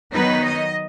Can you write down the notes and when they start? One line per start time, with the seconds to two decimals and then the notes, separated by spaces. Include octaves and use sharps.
0.12 D#3 F#3 B3 D#4 B4
0.44 D#5